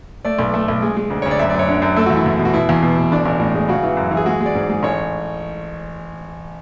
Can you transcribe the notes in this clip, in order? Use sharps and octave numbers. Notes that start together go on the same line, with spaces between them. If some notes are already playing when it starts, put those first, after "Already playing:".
A3 D5
B1
A3
B1
G#3
G#3
D2
C#5
D2
D5
F#2 E5
D5
F#2
C#5
D3
F#2
A3 A4
F#4
E2
E4
E2
B2
F#4
B2 E4
E2
B2
B2
A1 D4
A1
A2
G#3
C#3 F#4
E3
F#2
E3
G#4
G#3 F#4
G#3 D5
G#2
G#3
A1 C#5